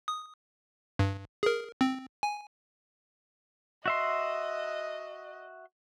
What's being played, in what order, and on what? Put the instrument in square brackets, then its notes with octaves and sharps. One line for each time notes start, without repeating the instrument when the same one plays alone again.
[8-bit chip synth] D#6
G2
G#4 A#4
C4
G#5
[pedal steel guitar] F#4 E5 C6 [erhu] D#5